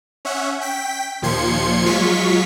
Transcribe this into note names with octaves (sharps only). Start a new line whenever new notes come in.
C#4 E5 F#5
G5 B6
D#2 A#2 F3 C6 G#6 C#7
F#3 G#3 F4 C#6 B6